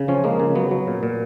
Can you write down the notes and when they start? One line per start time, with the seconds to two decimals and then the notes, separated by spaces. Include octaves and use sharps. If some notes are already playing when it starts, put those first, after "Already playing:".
Already playing: C#3
0.08 F3 C#4
0.24 G#3 A#3
0.40 C#3
0.55 F#3 B3
0.71 F#3
0.87 A#2
1.03 A#2